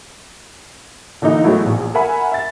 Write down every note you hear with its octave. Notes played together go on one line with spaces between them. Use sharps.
D3 E3 A#3 D#4
E3 F#3 G#3 A3 B3 E4
A#1
A#4 E5 F#5 G#5 B5
E5 A6